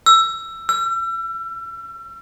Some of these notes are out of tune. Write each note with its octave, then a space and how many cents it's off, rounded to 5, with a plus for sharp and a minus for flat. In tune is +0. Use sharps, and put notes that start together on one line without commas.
E6 +15
E6 +40